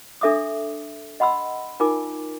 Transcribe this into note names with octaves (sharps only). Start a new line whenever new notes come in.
D4 A4 E5 D6 D#6
D#5 F#5 B5 C6 E6
D#4 F4 A#4 G#5 D6